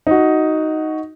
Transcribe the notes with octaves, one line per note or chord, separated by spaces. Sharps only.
D#4 F#4